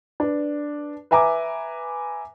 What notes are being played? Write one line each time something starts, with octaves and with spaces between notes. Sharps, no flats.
D4 B4
B4 E5 G#5 A#5 D6